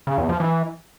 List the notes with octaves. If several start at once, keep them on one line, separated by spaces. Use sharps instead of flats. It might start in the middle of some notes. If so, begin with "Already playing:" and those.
C#3
E2
F3
E3